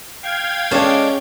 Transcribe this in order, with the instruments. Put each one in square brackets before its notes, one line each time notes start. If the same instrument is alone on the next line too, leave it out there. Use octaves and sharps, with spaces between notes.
[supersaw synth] F5 G5 G#6
[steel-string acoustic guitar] G#3 A4 D5 [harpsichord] C#4